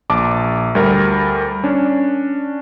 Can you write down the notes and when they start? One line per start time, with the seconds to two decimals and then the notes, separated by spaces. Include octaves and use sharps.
0.10 A#1 A5 D6
0.75 D2 G3 A#4
1.64 C#4 D4